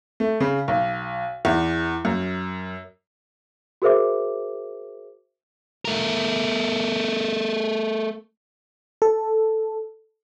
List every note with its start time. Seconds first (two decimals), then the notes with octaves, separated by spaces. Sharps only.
0.20 A3
0.40 C#3
0.68 B1
1.45 E2
2.05 F#2
3.82 F#4 G#4 A#4 C5 E5 D6
5.85 A3 A#4
9.02 A4